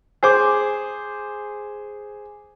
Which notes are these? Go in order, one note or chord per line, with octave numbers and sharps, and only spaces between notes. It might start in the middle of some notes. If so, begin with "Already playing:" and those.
G#4 C5 D6